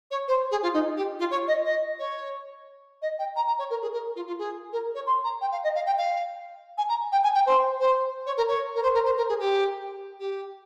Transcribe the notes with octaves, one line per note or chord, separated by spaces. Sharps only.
C#5
C5
G#4
F4
D#4
G4
F4
C#5
D#5
D#5
C#5
D#5
G5
A#5
A#5
C#5
A#4
G#4
A#4
F4
F4
G#4
A#4
C#5
C6
A#5
G5
F5
D#5
F5
G5
F5
G#5
A#5
G5
G#5
G5
C5
C5
C#5
A#4
C#5
A#4
C5
A#4
C5
A#4
G#4
G4
G4